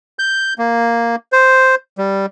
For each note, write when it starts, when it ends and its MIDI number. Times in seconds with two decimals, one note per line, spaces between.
0.19 0.54 91
0.58 1.16 58
1.32 1.75 72
1.98 2.26 55